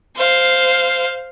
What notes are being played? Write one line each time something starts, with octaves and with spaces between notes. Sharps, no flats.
C5 F5